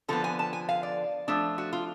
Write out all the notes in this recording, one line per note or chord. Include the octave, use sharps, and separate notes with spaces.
D3 F3 B3 A4
G#5
A5
G#5
F5
D5
F3 A3 D4
F#4
F4